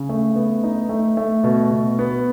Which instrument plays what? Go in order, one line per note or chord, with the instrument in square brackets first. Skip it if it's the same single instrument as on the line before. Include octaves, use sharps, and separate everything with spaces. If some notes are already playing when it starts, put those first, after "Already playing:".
Already playing: [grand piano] C#3
A3
B3
D#4
A3
A3
B2
B2
B3